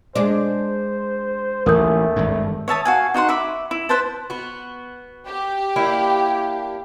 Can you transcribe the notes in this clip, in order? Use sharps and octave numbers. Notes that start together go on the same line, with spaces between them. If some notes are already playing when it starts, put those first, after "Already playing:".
G#3 D4 C5
A1 D#2 A3 A#4 D#6 G6
G#1 G2
C#5 E5 A5 D#6
F#4 F5 G#5
D#4 F#4 F#5 C6
E5 B5 D6
E4
B4 C5 A5
B3 F#4
G4
A#3 D4 E4